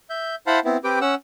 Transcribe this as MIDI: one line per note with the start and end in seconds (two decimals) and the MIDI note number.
0.10 0.35 76
0.10 0.35 91
0.47 0.60 64
0.47 0.60 72
0.47 0.60 77
0.47 0.60 78
0.47 0.60 81
0.47 0.60 83
0.65 0.77 59
0.65 0.77 60
0.65 0.77 64
0.84 0.99 60
0.84 0.99 67
0.84 0.99 71
0.84 0.99 79
0.84 0.99 86
1.01 1.15 61
1.01 1.15 78
1.01 1.15 88